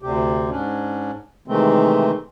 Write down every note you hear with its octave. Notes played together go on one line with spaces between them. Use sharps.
D2 C3 G4
G#2 C#4 D4
C3 D#3 E3 G#3 A3 C4